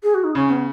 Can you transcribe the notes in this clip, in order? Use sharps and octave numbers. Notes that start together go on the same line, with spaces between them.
G#4
F#4
D#4
C#3 C#4
B3